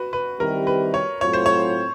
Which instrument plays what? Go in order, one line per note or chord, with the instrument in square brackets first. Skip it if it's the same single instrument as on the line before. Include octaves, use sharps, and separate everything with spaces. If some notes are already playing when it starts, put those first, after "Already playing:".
Already playing: [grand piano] F#4 B4
B4
[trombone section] D#3 G3 C4 E4 G4 [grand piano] A#4
[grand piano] B4
C#5
[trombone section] A2 F#3 A3 C4 F4 [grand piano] C#5
[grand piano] C5
C#5